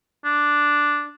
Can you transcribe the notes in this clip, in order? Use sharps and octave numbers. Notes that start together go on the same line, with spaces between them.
D4